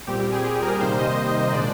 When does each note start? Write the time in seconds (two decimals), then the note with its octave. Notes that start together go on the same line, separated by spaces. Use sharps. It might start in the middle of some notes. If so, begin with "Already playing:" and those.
0.07 A#2 G3 C4 G4
0.20 G4
0.32 G#4
0.44 G4
0.63 A#4
0.81 C3 D#3 G3 A#3 C5
0.99 D#5
1.53 A#2 G#3 D4 D5